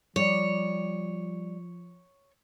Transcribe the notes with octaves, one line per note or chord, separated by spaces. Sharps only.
F3 G3 C#5 D5